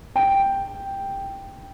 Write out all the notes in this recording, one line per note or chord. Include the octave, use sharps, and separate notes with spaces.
G5